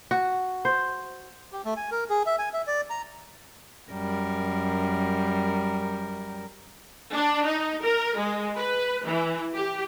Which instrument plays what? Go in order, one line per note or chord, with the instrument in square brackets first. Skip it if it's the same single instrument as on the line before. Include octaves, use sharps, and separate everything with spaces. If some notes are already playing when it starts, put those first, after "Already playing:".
[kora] F#4
C5
[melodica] G4
A3
G#5
A#4
G#4
E5
G#5
E5
D5
A#5
[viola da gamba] F#2 G3 A#4
[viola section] D4
D#4
A#4
G#3
B4
E3
G4